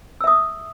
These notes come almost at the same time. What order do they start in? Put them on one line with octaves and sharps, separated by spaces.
E6 E5 D#6